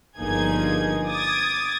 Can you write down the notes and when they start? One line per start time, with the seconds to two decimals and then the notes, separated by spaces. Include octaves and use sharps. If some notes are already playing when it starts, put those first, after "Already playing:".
0.18 G1 F3 A#3 D#4 G#4 G#6
1.07 D6 D#6 G#6 A6